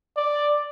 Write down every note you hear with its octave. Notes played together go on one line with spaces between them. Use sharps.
D5